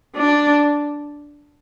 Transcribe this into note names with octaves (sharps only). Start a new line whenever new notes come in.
D4